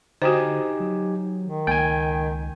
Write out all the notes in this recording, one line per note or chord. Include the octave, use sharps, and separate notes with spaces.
D3 D#4 F#4 G4 C5 G#5
F#3
D#3
C#2 A#3 G5 G#5